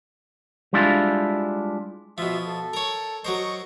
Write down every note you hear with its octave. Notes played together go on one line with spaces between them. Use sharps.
G3 G#3 D4 E4 F4
B2 F3 F4 E5
A4
A#4 C#5
F#3 A#4 C5 D#5 C#6